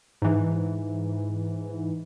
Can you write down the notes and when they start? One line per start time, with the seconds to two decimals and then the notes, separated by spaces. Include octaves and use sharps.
0.22 G#2 E3